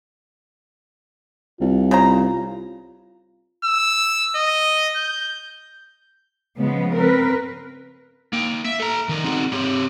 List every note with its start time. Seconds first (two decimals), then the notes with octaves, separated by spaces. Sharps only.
1.60 C2 F4
1.91 C#3 C5 A#5
3.64 E6
4.36 D#5
4.96 G6
6.57 C#3 F3 G#3 B3
6.94 C4 A#4 B4
8.33 A#3 G5
8.65 E5
8.80 A4 A#5
9.09 D#3 A#4 D5
9.24 C4 D#4 F#4 G#4 D5
9.53 C4 G4 C#5